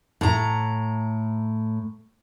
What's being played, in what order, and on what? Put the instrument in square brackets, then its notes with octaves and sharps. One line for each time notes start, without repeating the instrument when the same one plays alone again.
[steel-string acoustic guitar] A2 A#5